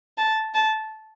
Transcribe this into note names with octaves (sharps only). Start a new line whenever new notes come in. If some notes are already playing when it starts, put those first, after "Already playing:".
A5
A5